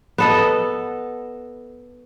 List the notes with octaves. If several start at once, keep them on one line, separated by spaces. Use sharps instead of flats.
B3 A4 D#5